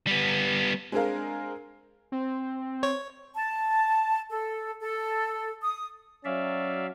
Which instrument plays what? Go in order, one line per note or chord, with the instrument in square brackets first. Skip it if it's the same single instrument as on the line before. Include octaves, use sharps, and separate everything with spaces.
[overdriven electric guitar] G3 B3
[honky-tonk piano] G#3 C4 D4 G#4 A#4 F5
[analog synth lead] C4
[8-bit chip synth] C#5
[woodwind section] A5
A4
A4
D#6
[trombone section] F#3 C#4 [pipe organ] D5 E5 F5